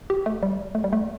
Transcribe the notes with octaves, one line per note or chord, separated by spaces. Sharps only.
G4
A3
G3
A3
G3
A3